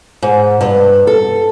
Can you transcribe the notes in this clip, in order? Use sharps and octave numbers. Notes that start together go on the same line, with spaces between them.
G#2
G2
A4